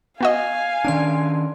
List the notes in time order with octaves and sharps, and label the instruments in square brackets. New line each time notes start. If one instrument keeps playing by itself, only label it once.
[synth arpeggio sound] B3 F#4 D#5 [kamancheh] F5 G#5
[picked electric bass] D#3 C#4 D4 [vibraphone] D5 C6